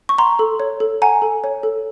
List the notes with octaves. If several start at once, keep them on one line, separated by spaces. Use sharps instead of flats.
C#6
F#5 A#5 C6
A4
C#5
A4
F#5 G#5 A#5
A4
C#5
A4